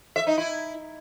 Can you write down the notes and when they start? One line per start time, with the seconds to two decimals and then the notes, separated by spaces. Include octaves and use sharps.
0.16 E5
0.27 D#4
0.38 E4